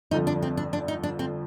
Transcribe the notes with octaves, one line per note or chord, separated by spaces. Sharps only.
G1 F2 D3 F3 D#4
D4
C4
D4
D4
D#4
D4
C4